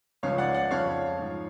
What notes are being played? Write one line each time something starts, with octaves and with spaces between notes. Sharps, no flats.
C#2 C#3 F3 C#5 F5
D5 F#5
D5 F#5
F2 C#3 F3 C#5 F5
G#2 F3